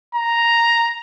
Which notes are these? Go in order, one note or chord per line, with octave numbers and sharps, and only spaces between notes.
A#5